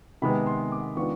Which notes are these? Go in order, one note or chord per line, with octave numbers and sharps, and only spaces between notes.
C3 D#3 G#3 B3 B5
C6
D6
D#3 G#3 B3 D4 F4 C#6